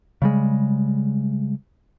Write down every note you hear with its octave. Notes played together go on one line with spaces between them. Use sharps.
C#3 G3 G#3